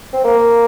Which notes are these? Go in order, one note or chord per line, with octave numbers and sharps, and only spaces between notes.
C4
A#3